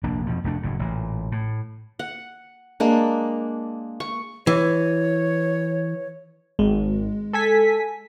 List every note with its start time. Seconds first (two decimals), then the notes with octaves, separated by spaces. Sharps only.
0.03 F1 A#1 A#3 D4
0.27 F2 B2 F3
0.44 F1 A3 D4
0.63 F#1 A2
0.79 A1 A#2
1.32 A2
1.99 F#5
2.80 G#3 A#3 D4
4.00 C#6
4.47 E3 C#5
6.59 G#1 G#3
7.33 A4 G#5 B6